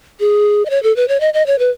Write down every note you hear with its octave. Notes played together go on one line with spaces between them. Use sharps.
G#4
D#5
C#5
A4
B4
C#5
D#5
D#5
C#5
B4